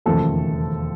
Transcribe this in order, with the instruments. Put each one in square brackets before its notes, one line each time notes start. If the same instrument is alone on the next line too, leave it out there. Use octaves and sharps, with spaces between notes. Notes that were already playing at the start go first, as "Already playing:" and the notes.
[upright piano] E1 D#2 C#3 F3 A3 A4